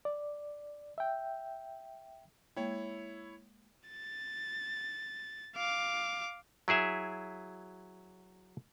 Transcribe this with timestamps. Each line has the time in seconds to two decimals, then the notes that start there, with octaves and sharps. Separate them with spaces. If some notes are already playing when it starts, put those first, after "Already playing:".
0.05 D5
0.98 E5 G5
2.56 G#3 A#3 E4 C#5 G5
3.89 A6
5.56 F5 D6
6.68 F#3 E4 G#4 E5